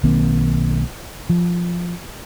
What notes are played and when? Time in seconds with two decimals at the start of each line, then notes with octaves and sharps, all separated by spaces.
0.03 B1 D#3 A#3 C4
1.30 F3